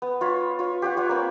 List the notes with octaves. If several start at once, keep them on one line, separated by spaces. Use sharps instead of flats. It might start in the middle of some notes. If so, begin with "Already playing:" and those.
B3
F4 C#5 B5
F4 C#5
G4 C#5 F#5
F4 C#5 F#5
A#3 C4 B5